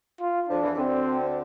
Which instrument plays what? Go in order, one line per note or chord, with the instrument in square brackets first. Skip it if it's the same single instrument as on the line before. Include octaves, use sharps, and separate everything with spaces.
[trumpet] F4
[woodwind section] F2 F3 [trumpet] D4
[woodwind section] E2 E3
E3
[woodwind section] D2 D3 [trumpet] C4